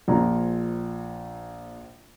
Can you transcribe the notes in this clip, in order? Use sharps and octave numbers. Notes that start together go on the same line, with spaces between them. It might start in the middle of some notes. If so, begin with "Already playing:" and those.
A#1 F3 A#5